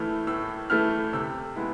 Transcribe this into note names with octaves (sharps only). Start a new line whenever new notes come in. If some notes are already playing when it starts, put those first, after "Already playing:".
Already playing: A2 E3 A3 E4 F6
A2 E6
E3 A3 E4 F6
C3 E6
G#3 B3 E4